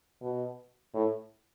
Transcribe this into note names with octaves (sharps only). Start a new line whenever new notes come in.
B2
A2